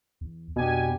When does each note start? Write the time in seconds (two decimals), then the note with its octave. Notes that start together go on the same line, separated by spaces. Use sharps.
0.21 E2
0.56 F2 B2 D4 G4 G#5